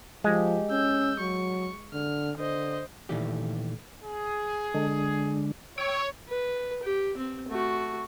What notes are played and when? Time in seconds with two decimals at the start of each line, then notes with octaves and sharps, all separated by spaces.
0.24 F3 G#3 G4
0.71 C#4 E6 G6
1.19 F#3 C#6
1.93 D3 F6
2.37 D3 C5 D#5
3.09 A#2 D#3 E3 A3 G4
4.03 G#4
4.74 D3 G#3 D4
5.78 C#5 G5 E6 G#6
6.29 B4
6.83 G4
7.17 C4
7.49 A3 F#4